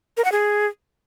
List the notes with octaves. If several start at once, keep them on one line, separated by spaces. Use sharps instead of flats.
A#4
F#5
G#4